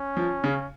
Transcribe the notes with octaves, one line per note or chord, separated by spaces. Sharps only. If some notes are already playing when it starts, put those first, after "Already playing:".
Already playing: C#4
F3
C#3